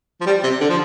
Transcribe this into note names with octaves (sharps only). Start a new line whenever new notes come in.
F3
G3
C3
D3
F3